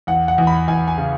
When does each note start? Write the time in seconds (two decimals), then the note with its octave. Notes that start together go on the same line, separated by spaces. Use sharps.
0.07 E2 F#5
0.28 F#5
0.38 E2
0.47 B5
0.68 E2 G#5
0.88 G#5
0.98 C#3